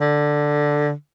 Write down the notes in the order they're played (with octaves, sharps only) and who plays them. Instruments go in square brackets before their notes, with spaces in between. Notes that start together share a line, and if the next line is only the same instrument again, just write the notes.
[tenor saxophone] D3